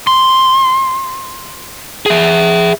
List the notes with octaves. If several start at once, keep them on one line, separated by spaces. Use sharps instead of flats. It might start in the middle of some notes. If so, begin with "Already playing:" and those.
C6
G#4 E5